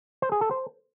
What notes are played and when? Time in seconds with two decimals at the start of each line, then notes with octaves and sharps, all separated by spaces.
0.22 C5
0.32 G#4
0.41 A4
0.51 C5